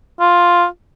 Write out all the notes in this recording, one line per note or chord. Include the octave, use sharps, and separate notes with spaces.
F4